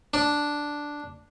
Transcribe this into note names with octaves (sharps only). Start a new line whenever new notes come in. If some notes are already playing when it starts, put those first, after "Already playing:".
D4